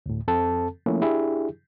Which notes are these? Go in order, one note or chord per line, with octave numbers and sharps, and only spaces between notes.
D2 A2
F2 C4 A4 A5
F3 A3 A#3 C#4 E4
D4 E4 G4 G#4